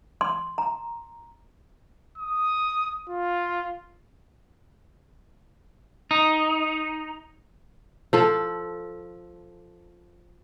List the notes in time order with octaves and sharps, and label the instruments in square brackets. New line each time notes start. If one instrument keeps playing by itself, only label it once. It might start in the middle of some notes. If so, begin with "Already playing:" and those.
[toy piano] C6
A#5
[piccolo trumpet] D#6
F4
[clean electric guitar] D#4
[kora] F3 A4